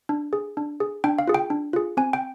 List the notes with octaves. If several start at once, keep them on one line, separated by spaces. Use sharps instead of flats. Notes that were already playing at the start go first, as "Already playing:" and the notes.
D4
G#4
D4
G#4
D4 G5
F5
F4 G#4
G5
D4
F4 G#4
C4 G#5
G5